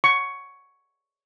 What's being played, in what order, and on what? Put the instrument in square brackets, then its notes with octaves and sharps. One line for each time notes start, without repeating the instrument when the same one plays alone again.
[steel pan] C#6